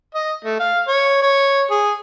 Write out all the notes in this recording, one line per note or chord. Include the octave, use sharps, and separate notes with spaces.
D#5
A3
F5
C#5
C#5
G#4